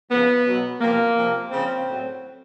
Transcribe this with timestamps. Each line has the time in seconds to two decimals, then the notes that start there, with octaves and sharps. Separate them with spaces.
0.11 C#3 F3 B3
0.46 B2 F#3
0.81 C3 F3 A#3
1.16 C3 F3
1.51 C#3 F3 C4
1.86 A2 F#3